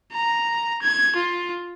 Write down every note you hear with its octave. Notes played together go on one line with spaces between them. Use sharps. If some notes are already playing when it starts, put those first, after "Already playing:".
A#5
G#6
F4